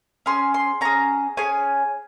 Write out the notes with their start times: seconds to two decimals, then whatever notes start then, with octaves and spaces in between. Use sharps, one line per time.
0.26 C#4 G#4 C6
0.54 C6
0.81 C#4 G#4 A#5
1.37 C#4 G#4 G#5